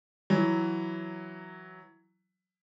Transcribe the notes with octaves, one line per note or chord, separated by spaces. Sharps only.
E3 F#3